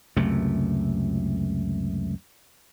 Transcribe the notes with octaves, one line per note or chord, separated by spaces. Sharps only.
C#2 F#2 C3 A3